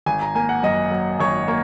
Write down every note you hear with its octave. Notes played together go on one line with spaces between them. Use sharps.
G#1 G#5
A#5
A#3 G#5
F#5
F#2 D#5
F#3
G#1 C#5
A#3 C#5